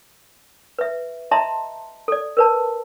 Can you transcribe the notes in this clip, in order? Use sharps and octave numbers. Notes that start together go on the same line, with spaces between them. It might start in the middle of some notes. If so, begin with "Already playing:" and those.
B4 E5
D#5 E5 A5 A#5 C6
A4 D5
A#4 B4 A5